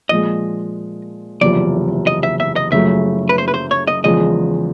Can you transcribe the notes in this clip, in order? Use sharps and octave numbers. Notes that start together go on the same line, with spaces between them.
A#2 F3 G#3 D#5
F#1 E2 C3 F3 D5
D#5
E5
E5
D#5
F#1 F#2 C#3 F3 A3 E5
B4
C5
B4
C5
C#5
D#5
E2 C#3 F3 G#3 D#5